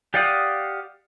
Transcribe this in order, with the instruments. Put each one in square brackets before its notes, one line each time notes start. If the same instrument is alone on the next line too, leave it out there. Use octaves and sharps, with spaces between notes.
[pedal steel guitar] G4 D5 F5 F#5 D#6